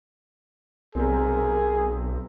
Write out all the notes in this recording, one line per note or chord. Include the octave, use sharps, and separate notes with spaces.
B1 C3 G3 C4 G#4 A#4